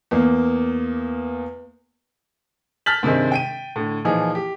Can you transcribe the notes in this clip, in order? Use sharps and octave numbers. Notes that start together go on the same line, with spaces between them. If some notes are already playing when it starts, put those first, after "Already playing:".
E2 A#3
A5 F6 G6 A6 B6 F#7
G2 C3 D#3 G#3 C4
G5 D7 D#7
A2 D3
A#2 E3 F3 D#4 G#4
G4